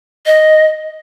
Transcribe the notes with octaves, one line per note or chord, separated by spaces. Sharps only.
D#5